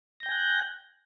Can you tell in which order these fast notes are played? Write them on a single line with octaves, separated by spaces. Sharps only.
A#6 G6 G5 G#5 F#6